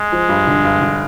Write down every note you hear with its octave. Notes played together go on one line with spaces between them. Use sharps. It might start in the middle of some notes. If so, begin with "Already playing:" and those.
Already playing: G#3
F3
G2
D3
G2
D3